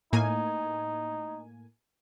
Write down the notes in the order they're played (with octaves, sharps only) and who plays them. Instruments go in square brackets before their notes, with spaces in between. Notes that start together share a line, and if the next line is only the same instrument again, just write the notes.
[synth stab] A2 A#3 G#5 [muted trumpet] D#4